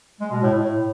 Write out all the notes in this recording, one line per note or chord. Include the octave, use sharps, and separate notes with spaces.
G#3
B2
A2
A2